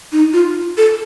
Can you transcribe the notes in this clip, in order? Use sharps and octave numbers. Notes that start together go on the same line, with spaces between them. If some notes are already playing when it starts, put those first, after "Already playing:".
D#4
F4
A4